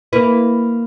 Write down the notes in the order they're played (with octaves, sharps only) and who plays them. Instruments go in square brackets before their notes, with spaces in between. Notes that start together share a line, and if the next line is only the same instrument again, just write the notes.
[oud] A#3 E4 B4